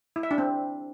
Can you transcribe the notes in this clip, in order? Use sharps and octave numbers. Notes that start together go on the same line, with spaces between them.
E4
E5
D4
C4